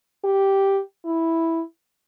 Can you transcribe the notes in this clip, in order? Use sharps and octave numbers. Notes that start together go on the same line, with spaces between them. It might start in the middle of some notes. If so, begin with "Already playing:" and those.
G4
E4